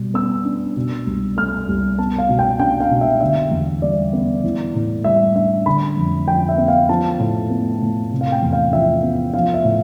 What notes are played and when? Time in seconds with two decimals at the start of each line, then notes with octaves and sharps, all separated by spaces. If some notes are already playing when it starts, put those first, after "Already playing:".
Already playing: B2 G3
0.14 B3 E6
0.45 D4
0.76 B2
1.07 C2
1.37 A3 F6
1.68 C2
1.98 B3 A5
2.18 F5
2.29 B2
2.39 G5
2.59 D4 G5
2.80 F5
2.90 B2
3.01 E5
3.20 D3 E5
3.51 E2
3.82 G3 D5
4.13 B3
4.44 E3
4.75 A2
5.04 G3 E5
5.36 D4 E5
5.66 D3 B5
5.97 F2
6.27 F3 G5
6.49 E5
6.58 B3
6.68 F5
6.89 F3 A5
7.19 A2
7.50 B3
7.81 A2
8.12 C3
8.21 F5
8.32 G5
8.42 E2
8.53 F5
8.73 F3 E5
9.03 B3
9.34 F3 F5
9.54 E5
9.65 A2